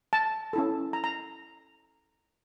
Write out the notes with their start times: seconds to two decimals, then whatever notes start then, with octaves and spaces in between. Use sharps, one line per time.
0.13 A5
0.53 C#4 E4 A4
0.93 A#5
1.04 A#5